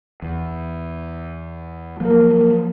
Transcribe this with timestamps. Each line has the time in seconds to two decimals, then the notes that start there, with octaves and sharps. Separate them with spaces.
0.22 E2
2.00 F3 F#3 A#3 A#4